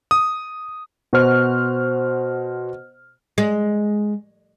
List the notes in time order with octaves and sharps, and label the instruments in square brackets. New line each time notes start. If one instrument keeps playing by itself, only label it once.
[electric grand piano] D#6
B2 F#4 C5 F6
[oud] G#3